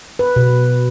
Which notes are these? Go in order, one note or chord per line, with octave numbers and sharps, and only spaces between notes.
B4
B2